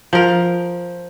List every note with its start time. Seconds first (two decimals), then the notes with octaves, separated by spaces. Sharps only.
0.13 F3 A#4